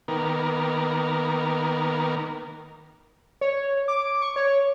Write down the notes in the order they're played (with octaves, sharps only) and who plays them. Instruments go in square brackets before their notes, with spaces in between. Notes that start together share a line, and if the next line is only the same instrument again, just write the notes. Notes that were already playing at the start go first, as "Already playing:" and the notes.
[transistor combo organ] D#3 A#3 B3 A#4
[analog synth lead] C#5
D6
C#6
C#5